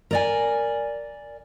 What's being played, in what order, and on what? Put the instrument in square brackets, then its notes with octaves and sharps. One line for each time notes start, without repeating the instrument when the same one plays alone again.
[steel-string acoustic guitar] A#4 D5 G#5